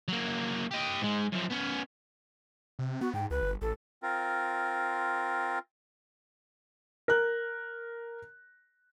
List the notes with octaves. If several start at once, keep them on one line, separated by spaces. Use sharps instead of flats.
F#3 A#3
G4 D#5
G#2 G#3
F#2 F3
B3 C#4
C3
B3 F#4
G#2 G5
C#2 B4
G1
A1 A4
C4 F4 A#4
A#4 F#6